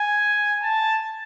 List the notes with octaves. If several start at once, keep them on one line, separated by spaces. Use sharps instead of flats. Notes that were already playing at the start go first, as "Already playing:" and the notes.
Already playing: G#5
A5